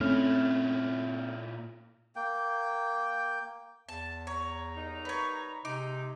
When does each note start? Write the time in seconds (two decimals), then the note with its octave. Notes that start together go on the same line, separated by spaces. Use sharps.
0.01 A#2 A3 C4 C#4 E4 F6
2.16 A#3 G5
3.89 E2 A5
4.27 C#5 A#5
4.77 G3 A#3 D#4
5.05 B4 C#5
5.65 C3 G#3 D#4 D6